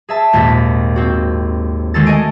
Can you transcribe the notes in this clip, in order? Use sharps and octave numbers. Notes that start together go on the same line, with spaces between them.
G#4 E5 A5
G#1 D#2 A#2 A6 B6
C4 F#4
D3 D#3 G#3 F#4 A4 A6
A3 D#5 G#5 D7